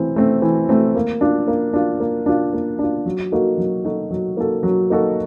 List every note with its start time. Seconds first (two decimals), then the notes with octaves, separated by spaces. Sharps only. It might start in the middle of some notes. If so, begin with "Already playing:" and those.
Already playing: E3 A3 C4
0.16 A3 C4
0.42 E3
0.69 A3 C4
0.95 A#3
1.21 D4 F4
1.48 A#3
1.73 D4 F4
2.00 A#3
2.26 D4 F4
2.53 A#3
2.79 D4 F4
3.05 F#3
3.32 A#3 D#4 F#4 A4
3.58 F#3
3.85 A#3 D#4 F#4 A4
4.11 F#3
4.37 A#3 D#4 F#4 A4
4.63 F#3
4.90 A#3 D#4 F#4 A4